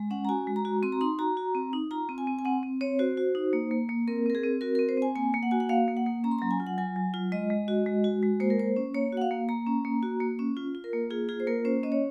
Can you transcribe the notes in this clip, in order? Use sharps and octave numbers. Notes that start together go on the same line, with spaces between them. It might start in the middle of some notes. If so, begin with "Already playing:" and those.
Already playing: G#3
C#4 F#5
A#5
F#4 G#5
G#3
A#5
F#4
C4 C6
A#5
D#4 C6
F#4 A#5
F#4
C4
D#4
F4 A#5
C4
G#5
C4
G#5
C4 F#5
C4
C4 C#5
F#4 C5
F#4
D#4
A#3
A#3
A#3
C4 A#4
C4 A#4
G#4
C4
F#4 A#4
C4 A#4
C5
C4 G#5
A#3 G#5
A#3
F#5
F#4 G#5
F#5
A#3 F5
A#3
F#5
A#3
C#4 A#5
C6
F#3 A#5
G#5
F4
F#5
F#3 G#5
F#3
F4
G#3 D#5
G#3
F#4
G#3
F#4
G#3
A#3 C5
A#4
A#3 C5
C#4
A#3 C#5
F#4 F#5
F5
A#3
A#3 A#5
C#4
A#3
F#4
A#3
C#4
F4
F4
A#4
A#3
F4 G#4
F4 G#4
C5
A#3 A#4
C#4 C5
C#4 D#5
C#5